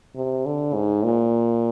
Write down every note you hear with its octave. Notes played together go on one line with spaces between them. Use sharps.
C3
D3
G#2
A#2